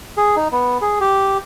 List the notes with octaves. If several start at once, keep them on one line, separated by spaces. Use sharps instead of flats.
G#4
D#4
B3
G#4
G4